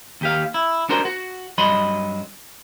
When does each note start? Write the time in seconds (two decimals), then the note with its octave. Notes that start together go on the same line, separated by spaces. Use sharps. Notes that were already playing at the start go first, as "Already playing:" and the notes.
0.21 D#2 G4 F5
0.54 E4
0.89 D4 F#4 A#4 C5
1.05 F#4
1.58 G2 F#3 D#5 B5 C6